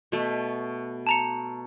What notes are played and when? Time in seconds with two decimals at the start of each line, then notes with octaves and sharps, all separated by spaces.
0.12 B2 A3
1.07 A5 A#5 C#7